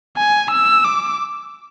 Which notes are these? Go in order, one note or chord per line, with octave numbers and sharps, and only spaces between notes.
G#5
E6
D6